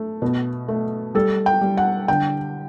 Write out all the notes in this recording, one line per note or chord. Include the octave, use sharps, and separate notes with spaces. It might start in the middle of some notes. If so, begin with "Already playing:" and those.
Already playing: A3
B2
A3
G3 A4
G5
G3
F#5
D3 G5